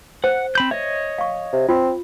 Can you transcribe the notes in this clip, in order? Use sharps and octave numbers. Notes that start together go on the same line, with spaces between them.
C5 F#5
C4 B5 G6
C#5 D#5 E5
F5 C#6
C3
C4 F4